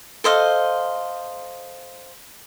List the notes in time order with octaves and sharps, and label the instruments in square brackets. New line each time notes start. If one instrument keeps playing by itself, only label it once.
[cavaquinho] A4 C5 D#5 F5